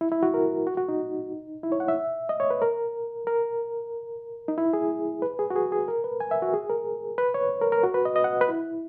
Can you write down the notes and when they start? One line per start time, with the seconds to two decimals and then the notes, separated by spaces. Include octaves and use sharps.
0.01 E4
0.12 E4
0.23 F#4
0.34 A#4
0.67 F#4
0.77 F#4
0.89 D#4
1.63 E4
1.72 C#5
1.80 F#5
1.88 E5
2.29 D#5
2.40 C#5
2.50 B4
2.62 A#4
3.27 A#4
4.48 D#4
4.58 E4
4.73 G#4
5.22 B4
5.39 G#4
5.50 F#4
5.56 G#4
5.72 G#4
5.88 A#4
6.04 B4
6.20 G#5
6.31 E5
6.42 F#4
6.54 G#4
6.70 A#4
7.18 B4
7.34 C#5
7.61 A#4
7.72 A#4
7.84 F#4
7.94 B4
8.05 D#5
8.16 D#5
8.24 F#5
8.41 B4
8.49 E4